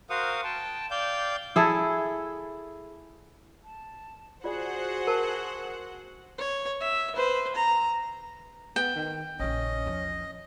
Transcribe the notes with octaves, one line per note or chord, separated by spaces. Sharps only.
F#4 A#4 C5 F5 F#5 D#6
G5 A5
D5 F5 G5 G6
E4 G#4 A4
A5
F4 F#4 G#4 C5 D5 F#5
A#4 A5
C#5
E5
B4 C5
A#5
B3 G5
D#3
A#1 C#3 C#4 D#5
E2 F3